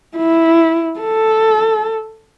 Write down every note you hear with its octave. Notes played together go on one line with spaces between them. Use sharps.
E4
A4